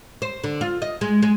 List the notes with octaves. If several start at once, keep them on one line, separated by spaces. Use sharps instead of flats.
C5
D3
F4
D#5
G#3
G#3